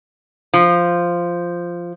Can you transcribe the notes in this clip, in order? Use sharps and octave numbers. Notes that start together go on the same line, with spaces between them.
F3